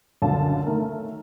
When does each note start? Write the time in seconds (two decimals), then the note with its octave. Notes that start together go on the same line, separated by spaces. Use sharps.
0.22 C#2 F#2 D3 F#3 F5 A5
0.66 D#3 A3 A#4